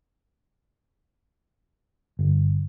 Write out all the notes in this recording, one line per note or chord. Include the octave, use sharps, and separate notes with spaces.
G1